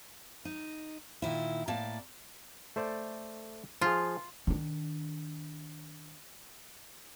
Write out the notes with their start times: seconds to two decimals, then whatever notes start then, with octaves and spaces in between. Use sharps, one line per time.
0.45 D#4
1.22 A#2 D#3 E4
1.68 A2 A#3 D5 A5
2.76 A3 C5 D5
3.81 F3 F4 G#4
4.47 D#3 D4